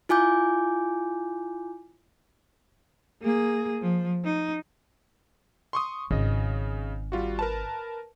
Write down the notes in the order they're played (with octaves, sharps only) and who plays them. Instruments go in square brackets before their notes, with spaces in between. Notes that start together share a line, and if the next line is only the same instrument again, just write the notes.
[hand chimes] E4 F4 G#5 D6 G6
[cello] A#3 G#4
F3
D#4
[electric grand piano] C6 C#6 D#6
[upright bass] G#1 [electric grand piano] C#3 D#5
[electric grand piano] G3 F4 F#4
A#4 B4 A5